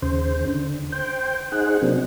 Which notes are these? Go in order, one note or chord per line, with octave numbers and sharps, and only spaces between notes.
D#2 C#3 C5
D3
C5 G5
D#4 G#4 C5 F#5
C3 F#3 A#3 C4 D4